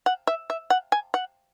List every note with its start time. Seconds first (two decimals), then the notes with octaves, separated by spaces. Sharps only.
0.06 F#5
0.27 E5
0.50 E5
0.70 F#5
0.92 G#5
1.14 F#5